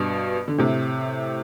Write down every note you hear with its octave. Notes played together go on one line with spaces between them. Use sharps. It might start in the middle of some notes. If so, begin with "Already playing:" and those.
Already playing: G2 B2
D3
A2 C3